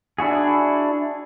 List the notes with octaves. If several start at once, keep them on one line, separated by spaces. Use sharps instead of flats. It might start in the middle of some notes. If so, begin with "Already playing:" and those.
D4 E4 F#4 G#4